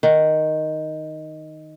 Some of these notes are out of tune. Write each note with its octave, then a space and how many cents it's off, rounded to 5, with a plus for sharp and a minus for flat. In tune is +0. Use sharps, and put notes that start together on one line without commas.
D#3 +0 F#5 -5